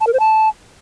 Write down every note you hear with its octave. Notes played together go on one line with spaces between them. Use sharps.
A5
A#4
C5
A5